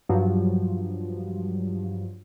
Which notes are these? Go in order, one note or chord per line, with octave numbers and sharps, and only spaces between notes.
G2 F3 F#3